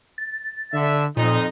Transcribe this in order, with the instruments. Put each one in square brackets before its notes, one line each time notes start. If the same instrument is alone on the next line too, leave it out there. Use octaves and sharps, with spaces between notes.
[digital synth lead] A6
[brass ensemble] D3 E5
[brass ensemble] F2 D#4 [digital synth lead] A#2